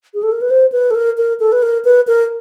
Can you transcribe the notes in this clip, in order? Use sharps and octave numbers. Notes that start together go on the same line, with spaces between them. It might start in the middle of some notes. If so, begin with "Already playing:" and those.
G#4
A4
A#4
B4
C5
B4
A4
A#4
A#4
A4
B4
A#4
B4
A#4